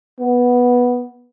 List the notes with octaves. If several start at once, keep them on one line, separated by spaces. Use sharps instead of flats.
B3